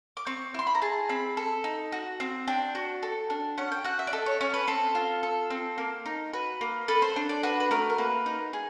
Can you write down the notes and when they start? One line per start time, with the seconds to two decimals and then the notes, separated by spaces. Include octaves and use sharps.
0.17 D6
0.26 C4 C#6
0.54 E4 C6
0.67 B5
0.75 A#5
0.82 G#4 A5
1.09 C4 B5
1.37 A4
1.64 D#4
1.92 F#4
2.20 C4
2.48 D4 G5
2.75 F#4
3.03 A4
3.30 D4
3.58 C#4 F#5
3.72 G5
3.85 F#4 F#5
3.99 E5
4.07 D5
4.13 A4 D#5
4.26 C#5
4.41 C#4 C#5
4.54 B4
4.68 C4 A4
4.95 F4
5.23 A4
5.50 C4
5.78 A#3
6.06 D#4
6.33 F#4 B4
6.61 A#3
6.88 A4 B4
7.02 C5
7.16 D4
7.29 D5
7.43 F#4 B4
7.60 B4
7.71 A3 A#4
7.90 A#4
7.98 A#3 B4
8.26 D#4
8.53 G#4